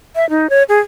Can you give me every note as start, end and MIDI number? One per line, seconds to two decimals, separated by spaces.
0.16 0.28 76
0.30 0.50 63
0.50 0.63 73
0.69 0.80 68